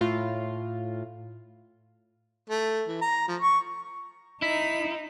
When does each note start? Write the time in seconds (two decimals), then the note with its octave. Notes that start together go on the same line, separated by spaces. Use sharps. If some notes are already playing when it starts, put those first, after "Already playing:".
0.01 A2 F4
2.50 A3
2.88 E3
3.02 A#5
3.28 F3
3.41 C#6
4.42 D#4 E4 B6